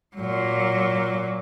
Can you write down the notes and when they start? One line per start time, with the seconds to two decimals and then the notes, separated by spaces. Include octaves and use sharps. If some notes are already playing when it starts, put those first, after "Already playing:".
0.17 A#2 F#3